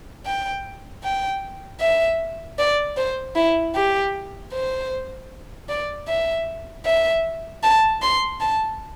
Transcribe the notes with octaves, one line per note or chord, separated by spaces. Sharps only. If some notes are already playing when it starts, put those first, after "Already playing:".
G5
G5
E5
D5
C5
E4
G4
C5
D5
E5
E5
A5
C6
A5